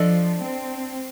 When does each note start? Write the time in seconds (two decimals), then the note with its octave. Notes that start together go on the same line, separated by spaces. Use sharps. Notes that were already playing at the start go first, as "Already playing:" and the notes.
Already playing: F3 D4 A4 D#5
0.43 C4